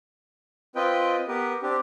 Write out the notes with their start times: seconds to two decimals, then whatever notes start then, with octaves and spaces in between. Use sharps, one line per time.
0.76 C4 F4 B4 D#5 G5
1.28 B3 G4 A#4 B4
1.62 C4 D4 G4